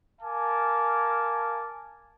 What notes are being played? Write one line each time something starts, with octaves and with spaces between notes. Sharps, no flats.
A#4 F5 G#5 A5 D6